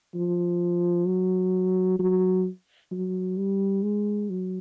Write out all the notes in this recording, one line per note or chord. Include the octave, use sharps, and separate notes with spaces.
F3
F#3
F#3
F#3
G3
G#3
F#3